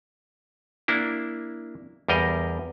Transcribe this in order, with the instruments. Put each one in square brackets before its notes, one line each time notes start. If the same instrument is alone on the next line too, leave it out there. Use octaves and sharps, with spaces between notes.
[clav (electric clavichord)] A#3 D4 E4
E2 G3 A#4 D#5